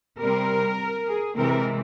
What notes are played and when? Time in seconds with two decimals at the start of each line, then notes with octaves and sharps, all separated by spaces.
0.21 C3 G3 C4 A#4
1.07 G#4
1.36 C3 E3 G#3 C4 A#4